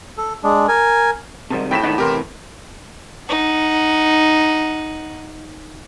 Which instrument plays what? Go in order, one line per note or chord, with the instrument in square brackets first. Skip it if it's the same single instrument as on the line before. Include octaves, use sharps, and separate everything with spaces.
[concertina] A4
G#3 D4
A#4 G#5
[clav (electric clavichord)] G#1 G#2 A5 [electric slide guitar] C3 D#3 G3
[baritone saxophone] A2 [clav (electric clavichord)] C#3 F#3 C4 [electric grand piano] G5 B6 E7
[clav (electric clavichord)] G#2 B3 [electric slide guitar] D#3 D4 D#4
[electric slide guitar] C3 E3 [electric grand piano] G4 A#4 C6
[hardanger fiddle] D#4 F#5